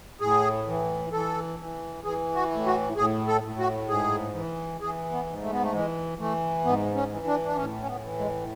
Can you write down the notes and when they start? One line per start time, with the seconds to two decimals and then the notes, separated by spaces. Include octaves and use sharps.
0.21 A2 G#4
0.67 E3
1.12 E3 A4
1.59 E3
2.04 E3 G#4
2.35 F#4
2.51 A2
2.66 F#4
2.96 A2 G#4
3.28 A4
3.43 A2
3.59 F#4
3.88 G#2 G#4
4.34 E3
4.81 E3 G#4
5.12 B3
5.27 G#2
5.42 A3
5.53 B3
5.62 A3
5.72 E3 G#3
6.18 E3 A3
6.65 G#2 B3
6.95 C#4
7.11 E3
7.26 D4
7.45 D4
7.56 A2 C#4
7.82 C#4
7.87 B3
8.04 E3
8.19 G#3